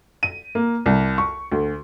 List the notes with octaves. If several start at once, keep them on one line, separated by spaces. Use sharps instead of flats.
D#7
A#3
C2
C#6
D2